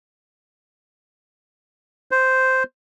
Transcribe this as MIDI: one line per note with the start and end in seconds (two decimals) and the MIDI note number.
2.11 2.63 72